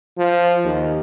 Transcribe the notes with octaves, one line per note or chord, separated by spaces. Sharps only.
F3
D#2